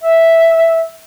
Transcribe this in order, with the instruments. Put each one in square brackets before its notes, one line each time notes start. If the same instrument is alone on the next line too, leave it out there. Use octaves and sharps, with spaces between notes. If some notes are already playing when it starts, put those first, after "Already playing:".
[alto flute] E5